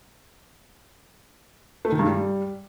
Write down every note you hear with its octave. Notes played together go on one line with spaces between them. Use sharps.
A3
D#3
G2
G3